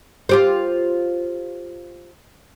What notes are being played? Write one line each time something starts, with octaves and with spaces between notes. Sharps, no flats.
F4 G4 C5